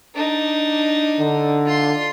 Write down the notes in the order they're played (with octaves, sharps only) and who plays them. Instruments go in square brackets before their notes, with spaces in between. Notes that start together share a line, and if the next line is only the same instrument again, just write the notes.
[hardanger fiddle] D4 D#4
[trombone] D3
[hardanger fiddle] F4 C6